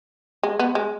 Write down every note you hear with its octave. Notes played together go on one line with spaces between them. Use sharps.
G#3
B3
G#3